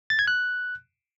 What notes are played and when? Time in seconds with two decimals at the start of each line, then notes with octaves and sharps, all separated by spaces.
0.10 A6
0.19 G#6
0.28 F#6